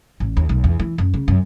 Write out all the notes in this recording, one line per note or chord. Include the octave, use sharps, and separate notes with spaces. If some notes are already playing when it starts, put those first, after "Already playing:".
A1
D#2
B1
E2
E3
F#2
C#3
F#2